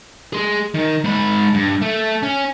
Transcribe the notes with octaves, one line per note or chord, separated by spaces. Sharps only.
G#4 C6
D#3
G#2 B5
G2
A3
C#4